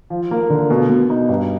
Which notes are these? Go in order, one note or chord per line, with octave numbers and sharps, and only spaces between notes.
F3
A#3
D3
B2
B2
D#4
G2